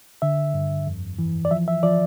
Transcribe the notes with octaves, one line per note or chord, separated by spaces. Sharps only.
D3 E5
G2
F2
E3
D5
F3 E5
E5
F3 D5